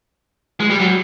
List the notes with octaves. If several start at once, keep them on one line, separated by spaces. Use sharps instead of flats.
G#3
G3
F#3